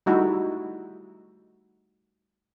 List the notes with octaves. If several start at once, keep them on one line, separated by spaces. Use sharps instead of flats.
G3 A3 D#4 E4 F#4 E5